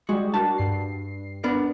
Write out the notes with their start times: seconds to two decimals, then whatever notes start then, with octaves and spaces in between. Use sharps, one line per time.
0.09 G3 G#3 F#4
0.34 D4 F#4 A#4 A5
0.58 G2 C7
1.44 B3 D4 A#4